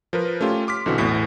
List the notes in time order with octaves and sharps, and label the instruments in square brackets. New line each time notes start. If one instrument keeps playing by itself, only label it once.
[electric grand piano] F3 A#4 B4
A3 C#4 F4 G4
C6 D6 F6 B6
B1 D3 E3 C4 F#4
A1 E2 A2 B6